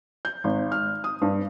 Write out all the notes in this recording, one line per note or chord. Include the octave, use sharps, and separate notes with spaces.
G6
G#1
F6
D#6
G2